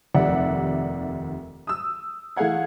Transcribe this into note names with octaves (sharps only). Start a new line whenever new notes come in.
F1 D#2 C3 D5 E5 F#5
D#6 E6
E3 A3 G#4 F5 F#5 G#6